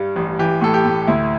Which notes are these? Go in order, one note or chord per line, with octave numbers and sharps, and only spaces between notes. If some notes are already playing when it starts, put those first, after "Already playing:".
Already playing: G2 G3
A1
E3 G4
A2 A4
G4
A2
D2 E4